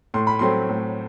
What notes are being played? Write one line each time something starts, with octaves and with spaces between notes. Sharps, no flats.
A2 C6
B5
F#3 A3 C4 C6
A2